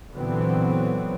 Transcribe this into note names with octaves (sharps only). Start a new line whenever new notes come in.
A#2 D3 E3 F#3 B3 C4